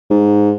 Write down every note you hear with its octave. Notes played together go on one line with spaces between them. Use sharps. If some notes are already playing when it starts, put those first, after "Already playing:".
G#2